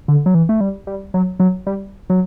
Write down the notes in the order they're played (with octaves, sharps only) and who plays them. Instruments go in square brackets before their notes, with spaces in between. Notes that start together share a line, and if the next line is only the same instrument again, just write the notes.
[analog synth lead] D3
F#3
E3
A3
G3
G3
F#3
F#3
G3
F#3